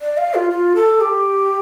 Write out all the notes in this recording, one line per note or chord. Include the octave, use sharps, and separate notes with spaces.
D5
F5
F4
F4
A4
G4